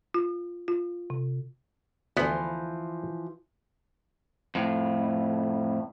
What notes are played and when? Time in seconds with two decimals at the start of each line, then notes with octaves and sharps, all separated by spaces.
0.14 F4
0.68 F4
1.10 C3
2.17 D2 E3 F3 B3
4.55 F2 A2